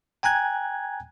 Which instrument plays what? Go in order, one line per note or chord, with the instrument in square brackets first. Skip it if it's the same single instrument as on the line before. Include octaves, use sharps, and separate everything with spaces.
[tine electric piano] G5 G#5 A#5 F#6 G#6